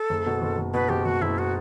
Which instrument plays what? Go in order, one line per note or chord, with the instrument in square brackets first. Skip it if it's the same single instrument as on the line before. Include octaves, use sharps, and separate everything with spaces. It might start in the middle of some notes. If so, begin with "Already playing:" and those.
Already playing: [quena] A4
[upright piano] F#1
B2
F#1
F#1
[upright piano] B2 [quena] B4
[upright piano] F#1 [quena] G4
[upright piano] F#1 [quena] F#4
[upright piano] F#1 [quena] E4
[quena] F#4